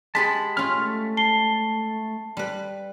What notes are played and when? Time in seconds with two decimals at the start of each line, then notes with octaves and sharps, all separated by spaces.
0.15 G#3 G4 G#4 A5 B5 B6
0.57 C#4 F4 F6
0.75 A3
1.17 A5 C7 G7
2.37 G3 B4